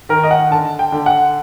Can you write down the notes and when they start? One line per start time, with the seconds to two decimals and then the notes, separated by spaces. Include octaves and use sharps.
0.09 D#3 A#4
0.24 D#5
0.31 F#5
0.51 D3 A5
0.79 G5
0.92 D3
1.06 F#5